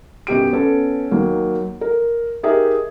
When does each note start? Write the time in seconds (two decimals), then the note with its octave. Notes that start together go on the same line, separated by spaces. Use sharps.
0.27 F#2 B2 G4 D7
0.53 B3 C#4 A4
1.11 D#2 F#3 A#3
1.81 A#4
2.43 D#4 G4 G#4 A#4 E5